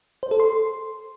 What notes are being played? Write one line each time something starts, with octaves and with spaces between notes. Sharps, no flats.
C5
A4
C6